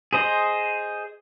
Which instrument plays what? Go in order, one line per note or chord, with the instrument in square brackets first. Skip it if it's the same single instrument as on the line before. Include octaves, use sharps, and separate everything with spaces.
[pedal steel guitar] G#4 C5 D#5